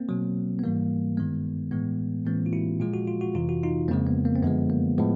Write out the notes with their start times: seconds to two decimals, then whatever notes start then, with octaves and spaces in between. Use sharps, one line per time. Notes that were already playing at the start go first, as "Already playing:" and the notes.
Already playing: A#3 C4
0.09 B2 F#3
0.59 B3
0.64 G#2 E3 G3 A#3
1.17 G2 D#3 G#3 B3
1.71 A2 E3 G#3 B3
2.26 A2 E3 G#3 A#3 C4
2.46 F4
2.53 E4 F#4
2.80 A#2 F3 G#3 F4
2.94 F#4
3.07 F4
3.21 F#4
3.34 F2 C3 E3 F4
3.49 F#4
3.63 D#4 F4
3.88 F2 C#3 F3 G#3 A#3 C4
4.06 B3
4.25 A#3
4.35 C4
4.43 F#2 D3 F3 G#3 B3
4.70 A#3
4.98 A2 F3 G#3 B3